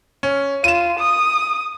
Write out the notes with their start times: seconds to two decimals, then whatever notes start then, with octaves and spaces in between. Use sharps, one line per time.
0.23 C#4
0.64 F4 D#7 E7
0.99 D#6